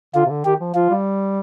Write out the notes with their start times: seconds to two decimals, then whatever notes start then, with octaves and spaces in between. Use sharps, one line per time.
0.15 D3 F4
0.26 C3
0.30 D3
0.45 D#3 G4
0.61 F3
0.75 F3 F4
0.90 G3